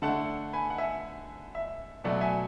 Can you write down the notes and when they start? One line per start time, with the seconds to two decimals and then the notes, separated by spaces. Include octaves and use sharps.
0.02 D3 A3 F#5 A5
0.53 G#5 B5
0.70 F#5
0.78 E5 G#5
1.55 E5
2.04 B2 F#3 A3 D5 F#5
2.21 E5 G#5